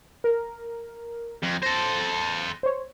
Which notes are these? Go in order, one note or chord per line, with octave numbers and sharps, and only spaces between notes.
A#4
F2
A4 C5 A#6
C5 C#5